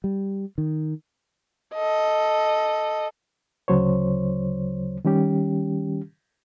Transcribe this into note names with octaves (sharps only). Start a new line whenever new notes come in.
G3
D#3
A4 D#5
D2 C#3 F#3 C5 C#5
D#3 G3 C#4 G4